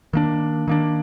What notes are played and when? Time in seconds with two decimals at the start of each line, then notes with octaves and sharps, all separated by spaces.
0.13 D#3 A#3 D4
0.68 D#3 A#3 D4